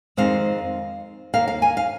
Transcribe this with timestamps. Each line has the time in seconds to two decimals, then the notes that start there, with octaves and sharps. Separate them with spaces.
0.17 F2 D#3 G#3 C4 F5
1.33 D#2 D#3 A#3 F5
1.48 F5
1.62 G#5
1.77 F5